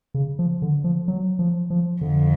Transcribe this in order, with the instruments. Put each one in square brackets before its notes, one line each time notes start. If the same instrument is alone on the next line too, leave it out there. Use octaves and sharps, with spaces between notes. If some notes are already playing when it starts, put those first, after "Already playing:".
[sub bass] C#3
F3
D3
F3
F#3
F3
F3
[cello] F2 [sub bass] D3